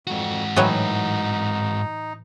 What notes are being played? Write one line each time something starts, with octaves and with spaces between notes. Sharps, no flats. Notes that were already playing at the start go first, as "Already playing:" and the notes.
F2 G#2 F#4
A2 E3 F#3 D#4